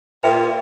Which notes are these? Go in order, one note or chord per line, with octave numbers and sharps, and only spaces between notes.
A#2 B4 E5 G5